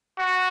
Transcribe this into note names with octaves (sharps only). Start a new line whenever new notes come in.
F#4